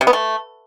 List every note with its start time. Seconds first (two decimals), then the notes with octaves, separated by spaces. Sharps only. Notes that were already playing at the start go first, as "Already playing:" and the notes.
0.01 C3
0.07 B3
0.13 A3